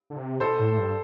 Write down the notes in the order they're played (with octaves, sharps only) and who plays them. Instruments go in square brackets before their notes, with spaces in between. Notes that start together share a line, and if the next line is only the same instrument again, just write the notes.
[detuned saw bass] D3
C3
[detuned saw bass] B2 [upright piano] A4 C5
[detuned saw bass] A2
A2
G2